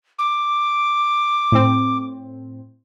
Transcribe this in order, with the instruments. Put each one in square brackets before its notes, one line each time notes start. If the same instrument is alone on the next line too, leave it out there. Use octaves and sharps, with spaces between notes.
[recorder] D6
[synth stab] A2 C4